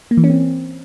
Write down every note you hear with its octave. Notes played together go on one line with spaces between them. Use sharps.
A#3
E3
C#4
C4